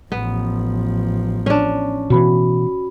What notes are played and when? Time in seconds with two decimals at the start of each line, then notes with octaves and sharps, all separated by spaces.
0.12 A1 F3 B3
1.46 C#4 D4
2.10 B2 E3 F#4 B5